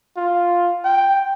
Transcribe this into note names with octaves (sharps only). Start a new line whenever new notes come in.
F4
G5